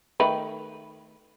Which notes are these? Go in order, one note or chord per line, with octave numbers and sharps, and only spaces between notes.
D#3 A3 B4